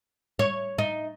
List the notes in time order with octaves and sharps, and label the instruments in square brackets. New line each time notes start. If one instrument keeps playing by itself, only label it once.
[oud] C#5
D#4